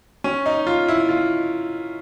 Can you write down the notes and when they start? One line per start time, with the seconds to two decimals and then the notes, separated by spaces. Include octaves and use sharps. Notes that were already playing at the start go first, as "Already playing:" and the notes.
0.24 C#4
0.46 D#4
0.67 F4
0.88 E4
1.09 F4